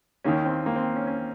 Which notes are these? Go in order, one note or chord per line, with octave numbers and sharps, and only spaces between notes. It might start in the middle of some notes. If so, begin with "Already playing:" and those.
D#2 D#3 A#3 C#4
C4
A#3
C4
C#4
C#4